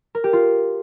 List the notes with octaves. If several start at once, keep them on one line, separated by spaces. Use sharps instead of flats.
A#4
G4
F4